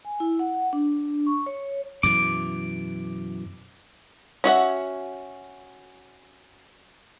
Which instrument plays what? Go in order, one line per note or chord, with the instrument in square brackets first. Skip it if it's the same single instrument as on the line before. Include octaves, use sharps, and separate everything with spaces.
[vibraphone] G#5
E4
F#5
D4
C#6
C#5
[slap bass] F#2 B2 E3 [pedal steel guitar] D6
[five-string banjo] C#4 F#4 E5 F#5